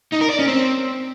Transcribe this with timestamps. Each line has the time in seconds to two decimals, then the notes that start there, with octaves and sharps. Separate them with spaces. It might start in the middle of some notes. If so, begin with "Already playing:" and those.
0.13 D#4
0.22 A#4
0.30 D5
0.39 C#4
0.48 C4